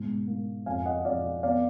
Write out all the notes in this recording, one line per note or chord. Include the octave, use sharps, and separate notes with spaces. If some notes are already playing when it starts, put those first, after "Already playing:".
Already playing: G#2 B2
A#3
F2 F5 G#5
D#5 F#5
F2 D5 F5
B3 D5 F5